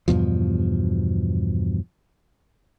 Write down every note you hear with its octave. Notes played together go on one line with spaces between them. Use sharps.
E2 G2 B2 F3